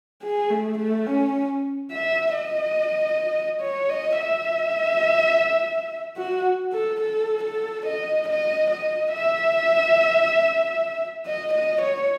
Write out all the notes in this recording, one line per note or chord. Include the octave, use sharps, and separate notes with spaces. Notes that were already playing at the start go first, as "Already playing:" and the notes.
G#4
A3
A3
C#4
E5
D#5
C#5
D#5
E5
F#4
A4
A4
A4
D#5
D#5
D#5
E5
D#5
D#5
C#5